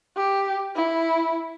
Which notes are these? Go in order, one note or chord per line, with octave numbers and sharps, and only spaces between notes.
G4
E4